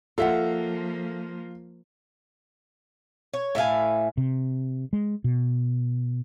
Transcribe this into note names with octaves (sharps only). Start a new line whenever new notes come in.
F3 A#3 F4 A4 E5 F#5
C#5
A2 E5 F5 G#5
C3
G#3
B2